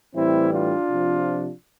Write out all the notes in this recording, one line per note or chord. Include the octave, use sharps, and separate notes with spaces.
A2 E3 G3 C4 E4
D4 F4
C3 F3